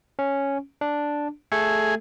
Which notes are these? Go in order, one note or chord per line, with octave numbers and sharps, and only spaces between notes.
C#4
D4
A3 G#4 A4